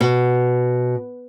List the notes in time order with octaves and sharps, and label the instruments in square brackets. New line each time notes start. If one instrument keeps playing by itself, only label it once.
[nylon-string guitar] B2